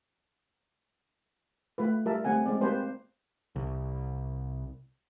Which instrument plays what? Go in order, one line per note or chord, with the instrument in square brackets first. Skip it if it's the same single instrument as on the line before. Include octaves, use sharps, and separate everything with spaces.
[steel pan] A3 F4 B4
G3 F4 A#4 E5 A5
G3 A3 C4 F#5 G#5
G#3 C4 D5
A#3 C4 G4 B4 C5 A5
[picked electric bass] C2